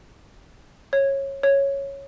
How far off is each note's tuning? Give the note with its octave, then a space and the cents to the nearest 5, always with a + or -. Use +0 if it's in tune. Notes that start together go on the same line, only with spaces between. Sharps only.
C#5 -15
C#5 -5